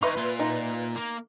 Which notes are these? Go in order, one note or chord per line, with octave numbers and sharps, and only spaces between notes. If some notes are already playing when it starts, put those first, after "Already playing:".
D#4 B4 C#5 E5 C6
A#2 F4
D#4
A#3